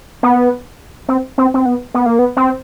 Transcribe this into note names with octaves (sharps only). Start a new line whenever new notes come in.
B3
C4
C4
C4
B3
B3
A#3
B3
C4